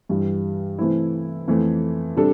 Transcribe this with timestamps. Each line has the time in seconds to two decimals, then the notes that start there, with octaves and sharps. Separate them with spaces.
0.09 G2 E3 G3
0.78 C3 E3 A3 C4 E4
1.47 F2 E3 A3
2.17 C3 G3 D4 A4